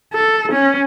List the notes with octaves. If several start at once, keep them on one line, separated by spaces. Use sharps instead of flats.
A4
C#4